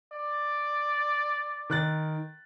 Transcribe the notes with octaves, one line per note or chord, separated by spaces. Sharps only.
D5
D#3 F#6 A6